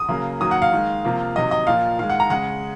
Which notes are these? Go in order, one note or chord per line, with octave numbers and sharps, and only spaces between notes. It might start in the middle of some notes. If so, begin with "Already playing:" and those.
Already playing: D#6
C#3 F#3 A#3
D#3 F#3 A#3 D#6
F#5
F5
D#3 G#3
C3 F3 A#3
C3 D#3 F#3 D#5
D#5
A#2 F3 A#3 F5
D#3 G#3 F5
F#5
A#5
C#3 G#3 F#5